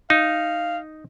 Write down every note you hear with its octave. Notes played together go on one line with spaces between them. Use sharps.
D#4 F5